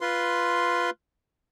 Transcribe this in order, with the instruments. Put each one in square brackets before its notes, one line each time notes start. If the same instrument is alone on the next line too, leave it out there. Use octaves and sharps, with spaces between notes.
[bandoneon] F4 B4 C6